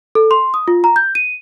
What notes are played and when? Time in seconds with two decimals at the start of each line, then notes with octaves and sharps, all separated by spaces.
0.15 A4
0.31 C6
0.54 D#6
0.68 F4
0.84 A#5
0.96 G6
1.15 D#7